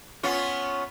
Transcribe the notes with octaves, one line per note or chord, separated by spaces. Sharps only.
B3 C#4 F4